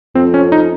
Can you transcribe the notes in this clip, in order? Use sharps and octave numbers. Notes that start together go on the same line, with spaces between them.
F2 C4
C#4
D#4